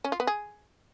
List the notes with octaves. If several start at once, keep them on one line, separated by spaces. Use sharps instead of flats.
C#4
F4
B3
G#4